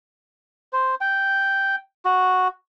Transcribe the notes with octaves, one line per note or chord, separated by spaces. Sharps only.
C5
G5
F#4